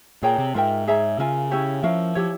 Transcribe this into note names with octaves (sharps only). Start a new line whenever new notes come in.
A#2 G#4 C#5 G5 A#5
C3
G#2 F4 A#4 E5 G5
G#4 C#5 E5 A#5
C#3 F4 A#4 E5 G#5
C#4 E4 G4 C#5
F3 C#4 E4 A#4 F5
F3 E4 G4 C#5